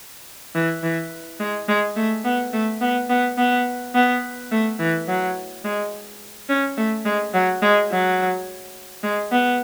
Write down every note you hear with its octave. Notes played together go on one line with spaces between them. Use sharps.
E3
E3
G#3
G#3
A3
B3
A3
B3
B3
B3
B3
A3
E3
F#3
G#3
C#4
A3
G#3
F#3
G#3
F#3
G#3
B3